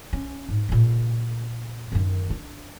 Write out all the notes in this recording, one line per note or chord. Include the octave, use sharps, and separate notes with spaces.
C#4
G#2
A#2 C#3
F#2 D#3
D4